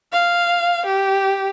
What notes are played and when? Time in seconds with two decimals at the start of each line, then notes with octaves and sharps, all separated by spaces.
0.13 F5
0.86 G4